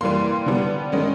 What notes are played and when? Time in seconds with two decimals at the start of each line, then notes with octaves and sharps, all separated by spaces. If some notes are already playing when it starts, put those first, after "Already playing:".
0.01 E3 G3 A#3 C6
0.46 D3 G3 B3
0.92 D#3 G#3 C#4